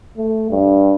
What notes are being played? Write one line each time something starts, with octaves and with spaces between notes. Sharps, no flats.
A3
G2